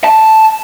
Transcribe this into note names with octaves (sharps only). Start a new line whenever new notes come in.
A5